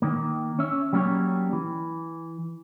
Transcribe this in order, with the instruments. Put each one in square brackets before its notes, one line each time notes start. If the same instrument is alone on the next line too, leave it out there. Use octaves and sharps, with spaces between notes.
[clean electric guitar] D#3 A#3
C#4 E5
F#3 G3 A#3 C#4 G4 C#5
E3